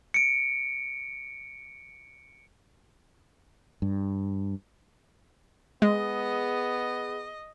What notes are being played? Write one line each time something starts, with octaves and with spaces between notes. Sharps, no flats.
C#7 D7
G2
G#3 B3 G#4 D#5